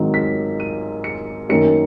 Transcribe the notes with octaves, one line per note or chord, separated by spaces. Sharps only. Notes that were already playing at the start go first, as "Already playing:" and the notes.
Already playing: G#1 G#2 D#3 F#3
B6
D#7
C#7
F#2 D#3 F#3 A#3 C#7